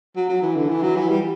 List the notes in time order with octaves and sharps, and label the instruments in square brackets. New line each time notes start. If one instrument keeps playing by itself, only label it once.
[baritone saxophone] F#3
F#3
E3
D3
E3
F#3
E3
G3